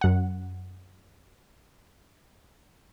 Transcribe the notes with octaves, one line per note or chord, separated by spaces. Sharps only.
F#2 F#5